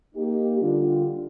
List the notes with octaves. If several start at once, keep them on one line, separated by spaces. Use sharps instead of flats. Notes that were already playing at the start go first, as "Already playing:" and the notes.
A#3 D#4 G4
D3 G3 D4 F4